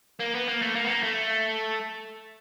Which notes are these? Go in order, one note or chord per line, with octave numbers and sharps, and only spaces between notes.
A#3
B3
A#3
A3
A#3
B3
A#3
A3